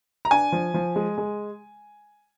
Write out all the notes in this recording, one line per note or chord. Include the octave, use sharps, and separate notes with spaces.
A#5
D4 G#5
F3
F3
G#3
G#3